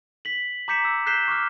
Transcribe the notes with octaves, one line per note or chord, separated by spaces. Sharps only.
B6 F#7
A#5 D6 G6 B6 C#7 E7
E6
F#6 G6 B6 C7 E7 G7
C#6 D6 F6